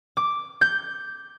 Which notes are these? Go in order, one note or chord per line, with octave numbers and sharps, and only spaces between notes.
D6
G6